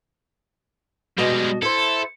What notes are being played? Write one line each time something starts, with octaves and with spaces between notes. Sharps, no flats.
B2 G3 G#3 D#5
E4 A4 C5